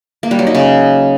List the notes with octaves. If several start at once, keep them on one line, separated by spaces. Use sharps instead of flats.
A#3
G3
F#3
D#4
C#3